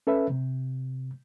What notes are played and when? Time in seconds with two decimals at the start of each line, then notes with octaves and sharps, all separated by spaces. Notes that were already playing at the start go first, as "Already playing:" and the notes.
0.07 C#4 A4 B4 E5 B5
0.30 C3